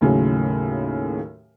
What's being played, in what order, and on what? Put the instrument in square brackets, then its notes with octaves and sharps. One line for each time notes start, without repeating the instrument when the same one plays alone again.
[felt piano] D#2 A2 C#3 F#3